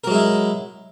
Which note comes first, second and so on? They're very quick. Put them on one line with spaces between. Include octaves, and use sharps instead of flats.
A#4 F#3 G#3 E4